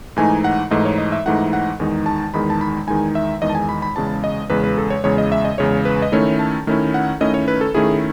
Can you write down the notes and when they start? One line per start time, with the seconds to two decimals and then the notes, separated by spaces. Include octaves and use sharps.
0.17 G#2 E3 A3 D#4 G#5
0.44 F#5
0.71 G#2 E3 A3 D#4 D#5
0.85 C#5
0.98 D#5
1.12 E5
1.26 G#2 E3 A3 D#4 F#5
1.53 F#5
1.80 E2 D#3 G#3 D#4
2.06 A5
2.34 E2 D#3 G#3 D#4 B5
2.50 A5
2.61 B5
2.87 E2 D#3 G#3 D#4 G#5
3.15 E5
3.42 E2 D#3 G#3 D#4 D#5
3.49 A5
3.55 G#5
3.69 B5
3.82 B5
3.96 E2 C#3 G#3 A5
4.24 D#5
4.50 E2 C#3 G#3 B4
4.64 B4
4.78 A4
4.90 C#5
5.04 E2 C#3 G#3 C#5
5.18 D#5
5.32 E5
5.45 D#5
5.58 E2 C#3 G#3 C#5
5.85 B4
6.02 D#5
6.12 D#3 A3 C#4 E4 C#5
6.39 A5
6.67 D#3 A3 C#4 E4
6.94 F#5
7.20 D#3 A3 C#4 E4 D#5
7.34 C#5
7.48 B4
7.61 A4
7.75 D#3 A3 C#4 E4 G#4